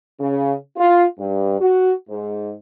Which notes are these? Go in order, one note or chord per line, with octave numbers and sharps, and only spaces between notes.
C#3
F4
G2
F#4
G#2